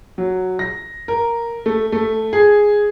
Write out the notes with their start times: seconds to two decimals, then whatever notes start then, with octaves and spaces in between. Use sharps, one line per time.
0.18 F#3
0.59 A#6
1.08 A#4
1.66 A3
1.92 A3
2.33 G#4